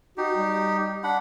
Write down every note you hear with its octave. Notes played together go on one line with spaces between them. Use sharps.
D#4 F#4 G4
G3
D4 F#5 B5